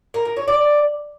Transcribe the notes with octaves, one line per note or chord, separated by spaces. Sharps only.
A#4
A#4
C#5
D5